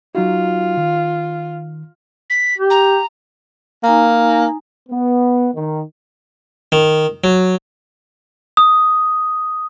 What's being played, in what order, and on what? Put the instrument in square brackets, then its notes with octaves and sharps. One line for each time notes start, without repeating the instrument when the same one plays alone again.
[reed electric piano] F#3 D#4 F#4 [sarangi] F4
[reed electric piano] D#3
[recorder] B6
[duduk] G4
[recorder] A#5
[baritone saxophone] A#3 [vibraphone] D#4 G#5 A#5
[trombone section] B3
D#3
[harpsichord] D#3
F#3
[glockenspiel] D#6